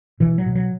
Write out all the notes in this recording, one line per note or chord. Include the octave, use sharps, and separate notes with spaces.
B2 E3
F#3
B2
F#3